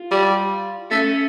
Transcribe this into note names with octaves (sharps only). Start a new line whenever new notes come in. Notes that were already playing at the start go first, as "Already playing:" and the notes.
Already playing: F4
G3
A3 C#4